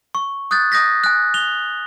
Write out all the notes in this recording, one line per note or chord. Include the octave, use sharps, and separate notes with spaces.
C#6
D#6 F#6 G6 A6
D#6 G6 A#6 B6
G#5 F#6
F7 G7